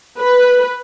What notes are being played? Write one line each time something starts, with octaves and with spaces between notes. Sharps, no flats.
B4